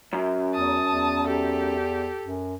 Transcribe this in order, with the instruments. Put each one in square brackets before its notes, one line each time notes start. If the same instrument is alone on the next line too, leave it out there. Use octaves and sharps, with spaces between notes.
[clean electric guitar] F#2
[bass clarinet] E2 [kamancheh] A5 D#6
[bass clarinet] E2
[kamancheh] G4 A4
[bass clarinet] F#2